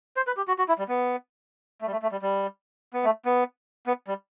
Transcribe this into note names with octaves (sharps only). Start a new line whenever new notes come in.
C5
B4
G4
F#4
F#4
E4
G3
B3
A3
G3
A3
A3
G3
G3
B3
A3
B3
B3
G3